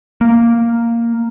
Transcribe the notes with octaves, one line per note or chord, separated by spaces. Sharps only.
A#3